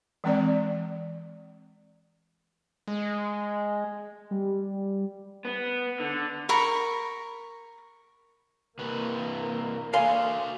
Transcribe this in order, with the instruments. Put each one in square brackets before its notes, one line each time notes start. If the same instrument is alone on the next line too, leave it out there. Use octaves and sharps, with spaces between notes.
[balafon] E3 G#3 C4 D5
[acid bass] G#3
[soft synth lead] G3
[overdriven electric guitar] B3
D3
[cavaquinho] A#4 B5 C#6
[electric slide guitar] C3 E3 B4 [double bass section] A#3
[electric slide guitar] F#4 A4 D5 [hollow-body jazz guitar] F5 G#5 C6